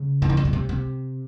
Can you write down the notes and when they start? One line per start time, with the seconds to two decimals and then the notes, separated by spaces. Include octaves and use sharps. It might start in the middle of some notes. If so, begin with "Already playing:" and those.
Already playing: C#3
0.22 E3
0.30 D#3
0.37 D3
0.45 C#3
0.53 C3
0.69 C3